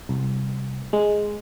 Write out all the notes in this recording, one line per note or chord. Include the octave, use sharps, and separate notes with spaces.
C2
G#3